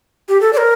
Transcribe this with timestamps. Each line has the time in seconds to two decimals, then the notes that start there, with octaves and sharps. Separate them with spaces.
0.28 G4
0.41 A4
0.53 D5
0.57 A#4